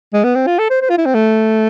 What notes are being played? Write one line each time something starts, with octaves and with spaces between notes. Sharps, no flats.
G#3
B3
C4
F4
A4
C5
C5
F4
E4
C4
A3